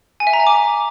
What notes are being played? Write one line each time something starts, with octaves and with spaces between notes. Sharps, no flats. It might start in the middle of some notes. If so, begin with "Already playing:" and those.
G#5
E5
A#5
G#5
D6